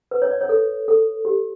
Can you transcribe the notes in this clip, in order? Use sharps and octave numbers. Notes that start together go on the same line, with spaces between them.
B4
C#5
D5
C#5
A4
A4
G4